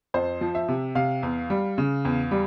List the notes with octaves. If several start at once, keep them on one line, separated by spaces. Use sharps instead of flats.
F2 C5
F3
E5
C3
C3 F5
E2
G3
C#3
E2
G3